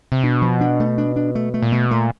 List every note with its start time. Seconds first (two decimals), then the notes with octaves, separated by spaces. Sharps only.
0.12 C3
0.23 B2 D4
0.42 F3
0.61 D4
0.80 A3
0.98 D4
1.16 D4
1.35 A3
1.54 A3
1.62 A#2
1.72 B2 A3
1.91 A#2 A3